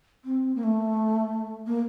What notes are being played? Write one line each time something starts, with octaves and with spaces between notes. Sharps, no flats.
C4
A#3
A3
A#3